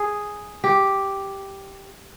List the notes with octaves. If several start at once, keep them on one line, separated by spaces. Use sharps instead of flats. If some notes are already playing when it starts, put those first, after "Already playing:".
Already playing: G#4
G4